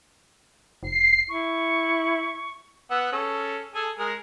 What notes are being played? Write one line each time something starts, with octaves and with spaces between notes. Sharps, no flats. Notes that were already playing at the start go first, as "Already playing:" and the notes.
F1 C7
E4 C#6
B3 F#5 E6
C#4 G#4 A4
G#4 A4 G#5
G#3 G#4 A#4